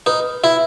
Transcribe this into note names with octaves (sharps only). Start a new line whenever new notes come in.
D#4 B4
E4 E5